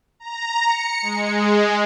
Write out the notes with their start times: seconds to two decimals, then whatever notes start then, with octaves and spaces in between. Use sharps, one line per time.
0.20 A#5
0.65 C#7
1.02 G#3